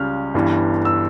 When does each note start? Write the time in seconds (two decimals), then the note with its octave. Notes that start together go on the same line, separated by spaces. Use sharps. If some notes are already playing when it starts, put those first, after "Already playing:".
Already playing: C#2 C#3 G3 C#4 F6
0.34 G1 G2 E3
0.85 E6